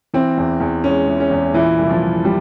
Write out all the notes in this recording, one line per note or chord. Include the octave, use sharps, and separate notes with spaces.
E3 C4
E2
E2
G#3 C#4
E3
C#4
E2
A#2 E3 E4
C2 E4
F3 F4
C2
G3